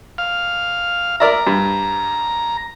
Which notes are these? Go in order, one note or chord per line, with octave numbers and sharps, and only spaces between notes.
F5
A#4 D5 E5 A#5
G2